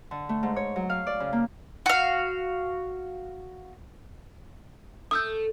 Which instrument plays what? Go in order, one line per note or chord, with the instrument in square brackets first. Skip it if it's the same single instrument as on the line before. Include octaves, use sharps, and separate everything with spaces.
[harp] D3
A3
G#2
C#5
F#3
F5
D5
C#3
A#3
[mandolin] F#4 F5
[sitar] A3 [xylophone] D#6 E6 G6